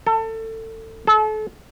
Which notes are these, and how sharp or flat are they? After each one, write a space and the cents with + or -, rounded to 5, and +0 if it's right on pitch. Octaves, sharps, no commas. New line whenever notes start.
A4 +25
A4 -35